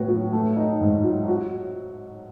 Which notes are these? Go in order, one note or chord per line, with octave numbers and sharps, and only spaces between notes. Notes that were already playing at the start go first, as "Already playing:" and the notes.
Already playing: A2 B3 F#4
F#3
A3
D#4
G#2
F#3
F#4